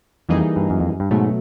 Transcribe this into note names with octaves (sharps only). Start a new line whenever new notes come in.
F2 E3 G3 A#3 D#4 G#4
G2
F#2
F2
F#2
G2
G#2 B2 F#3 A3